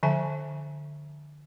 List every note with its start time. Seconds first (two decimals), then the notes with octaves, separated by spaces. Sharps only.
0.03 D3 F3 E5 G#5 A5